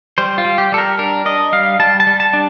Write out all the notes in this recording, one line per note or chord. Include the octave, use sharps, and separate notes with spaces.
G3 C5
F4
G3
G4
G3 A4
A#4
D4 A#4
D4 D#5
G3 F5
G3 A5
A5
G3
A5
D4